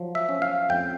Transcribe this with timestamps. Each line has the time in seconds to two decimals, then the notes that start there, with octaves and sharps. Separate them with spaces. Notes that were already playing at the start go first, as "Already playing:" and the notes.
Already playing: F3 F#3
0.15 E5
0.29 C#4
0.42 F5
0.69 F2 G5